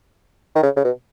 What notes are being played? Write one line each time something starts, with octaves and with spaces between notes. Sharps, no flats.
D#3
C#3
C#3
B2